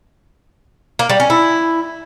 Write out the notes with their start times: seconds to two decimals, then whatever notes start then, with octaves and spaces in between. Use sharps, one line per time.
0.99 A#3
1.10 G3
1.20 C#4
1.30 E4